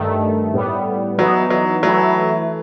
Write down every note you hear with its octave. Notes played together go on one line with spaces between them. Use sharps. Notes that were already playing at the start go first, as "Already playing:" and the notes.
Already playing: G2 D#3 A3
A2 G3 B3
E3 F#3 B3 D#4
F#3
E3 F#3 A3 E4